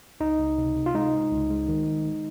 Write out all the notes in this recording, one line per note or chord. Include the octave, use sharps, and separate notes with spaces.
C#2 D#4
C#2
C3
C3
F4
G#3 D#4
G#3
C#2
G#3
D#3
G#3
G#3